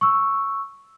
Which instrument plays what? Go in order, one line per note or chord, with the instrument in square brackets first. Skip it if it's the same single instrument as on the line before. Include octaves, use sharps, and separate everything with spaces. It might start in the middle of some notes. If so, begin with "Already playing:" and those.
[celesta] C#6 E6